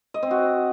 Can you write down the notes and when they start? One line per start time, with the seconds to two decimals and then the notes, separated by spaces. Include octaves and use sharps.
0.14 D#5
0.23 C4
0.31 F#4